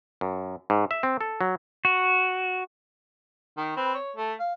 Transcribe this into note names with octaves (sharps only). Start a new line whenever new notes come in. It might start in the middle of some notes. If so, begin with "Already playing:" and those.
F#2
G#2
E5
C4
A4
F#3
F#4
D#3
C4 B4
C#5
A3
F5